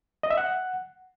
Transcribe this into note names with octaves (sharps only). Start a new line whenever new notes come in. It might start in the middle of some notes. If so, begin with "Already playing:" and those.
D#5
E5
F#5